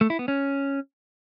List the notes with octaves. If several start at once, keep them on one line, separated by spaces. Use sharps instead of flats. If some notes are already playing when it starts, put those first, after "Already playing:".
A3
E4
B3
C#4